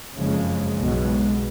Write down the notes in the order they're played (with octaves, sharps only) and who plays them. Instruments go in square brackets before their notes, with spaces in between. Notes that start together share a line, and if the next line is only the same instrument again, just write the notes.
[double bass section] F#1 F2 C#3 F3 G#3
B1 B2 G#3